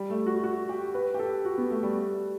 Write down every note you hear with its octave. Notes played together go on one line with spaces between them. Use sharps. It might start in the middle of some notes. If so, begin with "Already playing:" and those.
Already playing: G3
A3
F#4
F#4
G4
B4
G4
A4
F#4
B3
A3
G3